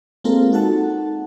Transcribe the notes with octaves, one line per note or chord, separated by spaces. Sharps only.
G#3 A#3 C4 F4 A4 A#4
D#4 F#4 A4 F#5 A5